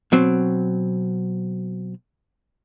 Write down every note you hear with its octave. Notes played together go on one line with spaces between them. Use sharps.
B2 F#3 C4